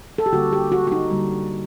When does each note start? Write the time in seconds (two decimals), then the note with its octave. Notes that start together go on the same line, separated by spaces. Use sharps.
0.18 A4
0.26 G4
0.33 D3 G3 A#3 F#4
0.53 G4
0.72 F#4
0.87 F#4
0.92 D#4
1.10 D3 G3 A#3